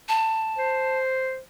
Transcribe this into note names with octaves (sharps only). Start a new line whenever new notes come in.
A5
C5